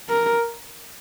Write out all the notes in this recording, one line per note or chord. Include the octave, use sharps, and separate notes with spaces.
A#4